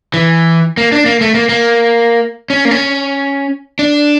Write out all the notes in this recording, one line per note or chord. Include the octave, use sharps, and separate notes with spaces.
E3
A#3
D4
A#3
A3
A#3
A#3
C#4
A#3
C#4
D4